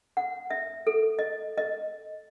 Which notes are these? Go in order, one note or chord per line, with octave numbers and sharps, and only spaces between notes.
F#5
E5
A4
D#5
D#5